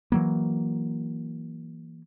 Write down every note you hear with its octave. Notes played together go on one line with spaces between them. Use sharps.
E3 F#3 A#3